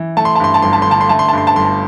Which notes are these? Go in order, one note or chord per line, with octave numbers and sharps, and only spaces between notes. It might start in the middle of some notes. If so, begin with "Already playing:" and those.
Already playing: E3
A3 A5
C6
A5
G2 C6
A5
G1 C6
A5
C6
D3 A5
C6
A3 A5
C6
A5
G2 C6
A5
G1 C6
A5